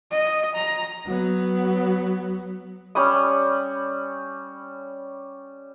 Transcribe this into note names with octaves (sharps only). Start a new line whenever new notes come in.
D#5
A#5
F#3 B3
G3 C#4 B5 D#6